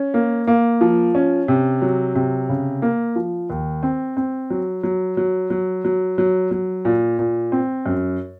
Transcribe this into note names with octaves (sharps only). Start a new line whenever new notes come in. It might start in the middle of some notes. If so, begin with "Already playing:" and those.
Already playing: C#4
A#3
A#3
F3
C#4
C3
F#3
C3
C#3
A#3
F3
D#2
C4
C4
F#3
F#3
F#3
F#3
F#3
F#3
F#3
A#2
A#2
C4
F#2